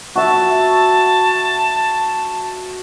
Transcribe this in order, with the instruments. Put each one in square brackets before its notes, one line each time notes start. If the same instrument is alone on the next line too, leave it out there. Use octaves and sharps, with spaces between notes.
[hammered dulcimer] F#4 E5 [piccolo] A5